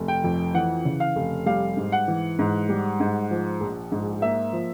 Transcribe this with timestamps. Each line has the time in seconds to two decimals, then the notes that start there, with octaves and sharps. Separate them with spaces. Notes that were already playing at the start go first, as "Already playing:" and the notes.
Already playing: F1
0.08 G5
0.24 F2
0.54 E3 F#5
0.85 C#3
1.00 F5
1.16 F1
1.46 G3 F5
1.77 G#2
1.92 F#5
2.08 E3
2.39 G#2
2.69 G3
3.00 G#2
3.31 F3
3.61 A#1
3.92 G#2
4.22 A#3 E5
4.53 F3